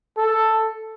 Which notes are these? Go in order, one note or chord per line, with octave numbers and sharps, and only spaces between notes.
A4